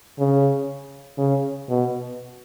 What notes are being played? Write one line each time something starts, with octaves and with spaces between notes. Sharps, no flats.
C#3
C#3
B2